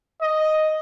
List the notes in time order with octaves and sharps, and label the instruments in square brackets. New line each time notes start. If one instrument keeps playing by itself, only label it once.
[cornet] D#5